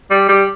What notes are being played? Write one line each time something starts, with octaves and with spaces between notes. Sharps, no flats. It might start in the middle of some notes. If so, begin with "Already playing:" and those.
G3
G3